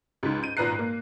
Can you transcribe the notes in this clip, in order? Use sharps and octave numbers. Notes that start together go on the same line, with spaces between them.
C#2 G#2
G6 D#7
G#1 A#2 B4 A#5 F#6 C7
A#3